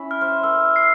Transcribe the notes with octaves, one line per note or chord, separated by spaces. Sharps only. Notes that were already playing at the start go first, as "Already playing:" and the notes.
Already playing: C#4 E4
F6
C5
A#4 E6
C7